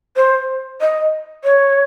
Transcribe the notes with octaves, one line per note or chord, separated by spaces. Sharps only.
C5
D#5
C#5